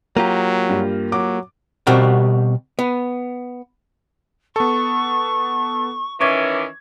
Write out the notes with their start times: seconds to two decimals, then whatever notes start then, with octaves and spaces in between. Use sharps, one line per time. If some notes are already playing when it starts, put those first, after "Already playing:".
0.17 F#3 A#3 F4 G4 A#5
0.69 G2
1.12 F#3 D6
1.87 B2 G3 C4 F#4 G4 A#4
2.79 B3
4.56 B3 A4 C#6
6.21 D#3 E3 C#4 C#6 D6 G#6